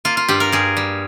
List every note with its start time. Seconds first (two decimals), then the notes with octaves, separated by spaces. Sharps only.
0.05 A#3 F4
0.17 F4
0.28 G2 G4
0.40 A#4
0.52 G2 G#4
0.77 G3